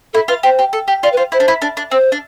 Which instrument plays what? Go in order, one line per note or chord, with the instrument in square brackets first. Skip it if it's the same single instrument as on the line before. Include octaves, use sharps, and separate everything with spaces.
[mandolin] E4 [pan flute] A4
[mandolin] F4 [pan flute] B4
[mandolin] G4 [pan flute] C5
[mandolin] G4
A4
G4
[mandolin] F4 [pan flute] D5
[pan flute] B4
[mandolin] F4 [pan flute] C5
[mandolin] E4 [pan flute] C5
[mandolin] D4
E4
D4
D4
[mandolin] C4 [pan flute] C5
[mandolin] D4